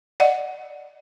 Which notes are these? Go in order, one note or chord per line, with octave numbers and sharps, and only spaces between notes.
D5 D#5 F#5